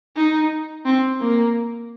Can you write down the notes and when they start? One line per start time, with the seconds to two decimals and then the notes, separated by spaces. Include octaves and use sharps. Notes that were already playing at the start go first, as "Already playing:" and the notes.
0.17 D#4
0.86 C4
1.21 A#3